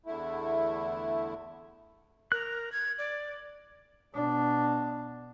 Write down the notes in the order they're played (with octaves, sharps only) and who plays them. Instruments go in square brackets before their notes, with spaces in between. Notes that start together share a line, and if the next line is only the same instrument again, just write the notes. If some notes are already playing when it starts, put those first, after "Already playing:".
[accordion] E2 D3 A3 E4
[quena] A#4 [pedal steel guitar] F#6
[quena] G#6
D5
[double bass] B2 D4